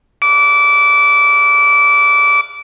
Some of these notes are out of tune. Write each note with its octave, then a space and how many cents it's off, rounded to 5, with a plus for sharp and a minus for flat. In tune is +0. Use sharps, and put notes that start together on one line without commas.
D6 -25